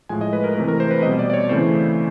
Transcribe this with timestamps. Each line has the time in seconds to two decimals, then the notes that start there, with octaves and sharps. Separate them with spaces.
0.09 A2 F3 G#3 G#5
0.21 D#5
0.33 B4
0.44 A#4
0.56 C3 E3 A3 A#4
0.68 A#4
0.80 C5
0.91 B4
1.02 C4 D#5
1.05 B2 G3
1.19 D5
1.30 D5
1.34 C#5
1.49 C#3 E3 A3 C4 C5